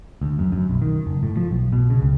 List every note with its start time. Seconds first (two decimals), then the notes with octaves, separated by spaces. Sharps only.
0.22 D2
0.39 F#2
0.52 F#2
0.69 B1
0.82 D#3
1.07 F#1
1.23 A2
1.37 F3
1.51 B1
1.73 B2
1.90 C#3
2.02 C#2